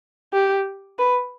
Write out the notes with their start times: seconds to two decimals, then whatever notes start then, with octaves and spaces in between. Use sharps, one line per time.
0.33 G4
0.99 B4